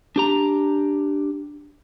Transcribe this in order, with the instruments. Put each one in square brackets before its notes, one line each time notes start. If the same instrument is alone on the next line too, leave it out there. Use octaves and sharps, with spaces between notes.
[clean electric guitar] D4 G4 A#5